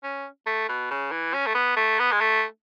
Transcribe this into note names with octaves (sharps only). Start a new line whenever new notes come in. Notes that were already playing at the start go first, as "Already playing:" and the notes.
C#4
A3
B2
C#3
E3
C#4
A3
B3
A3
B3
G#3
A3